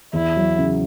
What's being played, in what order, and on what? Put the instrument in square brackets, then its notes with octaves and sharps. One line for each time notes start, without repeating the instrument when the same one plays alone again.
[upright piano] E2 [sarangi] E4
[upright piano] F#3
C#3